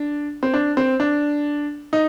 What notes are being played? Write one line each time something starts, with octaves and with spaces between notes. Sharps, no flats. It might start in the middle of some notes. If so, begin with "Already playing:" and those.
Already playing: D4
C4
D4
C4
D4
D#4